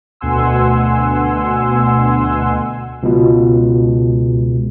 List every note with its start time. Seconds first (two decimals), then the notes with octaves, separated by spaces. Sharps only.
0.21 D2 B2 F#5 G#5 C6 E6
3.03 C#2 B2